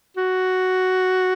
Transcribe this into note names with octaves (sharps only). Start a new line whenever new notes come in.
F#4